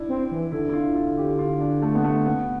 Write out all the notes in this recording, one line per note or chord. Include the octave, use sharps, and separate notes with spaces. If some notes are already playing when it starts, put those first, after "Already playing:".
Already playing: D4 E4
C4
E3
D3 E4
E4
F4
F4
G4
F4
D4
A3
B3
A3
B3